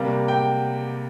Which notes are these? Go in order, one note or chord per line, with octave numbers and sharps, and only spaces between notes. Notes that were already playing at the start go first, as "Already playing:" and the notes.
Already playing: C3 G3 A#3
G5